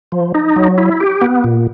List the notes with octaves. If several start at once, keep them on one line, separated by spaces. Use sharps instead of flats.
F3
D#4
F#3
E4
G4
B3
A#2